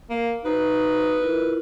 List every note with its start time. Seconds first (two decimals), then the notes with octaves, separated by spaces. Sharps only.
0.10 A#3
0.45 D#4 F#4 B4 C5
1.20 E4 F4 A#4